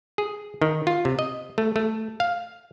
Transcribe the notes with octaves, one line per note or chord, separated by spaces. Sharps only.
G#4
D#3
F4
C3
D#5
A3
A3
F5